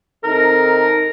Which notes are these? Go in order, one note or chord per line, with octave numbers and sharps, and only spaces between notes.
C3 D#4 A4 A#4